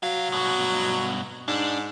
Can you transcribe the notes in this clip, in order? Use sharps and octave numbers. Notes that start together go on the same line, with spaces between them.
C2 F#3 F5
G2 B2
G#2 D4